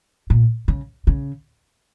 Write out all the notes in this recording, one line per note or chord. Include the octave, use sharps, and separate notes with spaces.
A#2
C#3
C#3